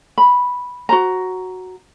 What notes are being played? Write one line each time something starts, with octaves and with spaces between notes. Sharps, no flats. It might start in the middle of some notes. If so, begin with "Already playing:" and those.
B5
F#4 C5 A#5